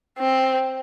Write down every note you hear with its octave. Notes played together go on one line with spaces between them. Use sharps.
C4